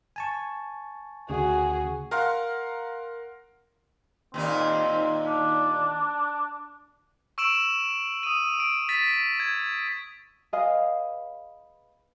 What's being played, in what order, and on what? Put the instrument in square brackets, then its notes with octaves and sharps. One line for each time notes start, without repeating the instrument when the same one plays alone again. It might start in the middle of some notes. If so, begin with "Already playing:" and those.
[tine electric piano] G#5 A5 C#6
[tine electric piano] D2 C#3 [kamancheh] F#4 G#4
[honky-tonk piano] A#4 F5 F#5 C6 F6
[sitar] D#2 A#2 D#4 [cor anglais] C4
[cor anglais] D4
[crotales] C#6 E6 D7 E7 F#7
D#6 D#7
D7
A6 B6
G#6
[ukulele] G#4 B4 D#5 F5